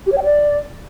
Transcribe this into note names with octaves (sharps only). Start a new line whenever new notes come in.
G4
C#5
G5
D5